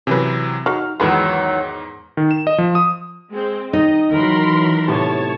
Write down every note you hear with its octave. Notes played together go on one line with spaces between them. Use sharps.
C3 E3 F#3 C#4 B4
F#3 D#4 F6
E2 G#2 D#3 E3 F#3 F4 B4
D#3
E7
D#5
F3
D#6
G#3 C4
D#3 D#4 D#5
E3 F#3 A#4 B5 C6
A2 C3 B3 C#5 A5